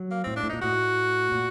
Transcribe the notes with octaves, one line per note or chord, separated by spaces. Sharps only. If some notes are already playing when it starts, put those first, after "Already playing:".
Already playing: F#3
A#3
A2 C4
D4
A2
A#2 D#4
A2 F#4
A#2